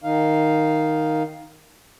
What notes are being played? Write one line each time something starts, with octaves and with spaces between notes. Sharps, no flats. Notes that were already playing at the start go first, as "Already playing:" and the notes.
D#3 D#4 F5